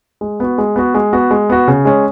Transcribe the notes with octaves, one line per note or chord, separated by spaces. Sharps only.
G#3
B3 F#4
G#3
B3 F#4
G#3
B3 F#4
G#3
B3 F#4
C#3
G#3 C#4